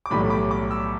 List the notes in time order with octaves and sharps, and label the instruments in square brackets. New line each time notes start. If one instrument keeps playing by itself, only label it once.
[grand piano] D6
B1 A2 E3 G3 B5
D6
D6
E6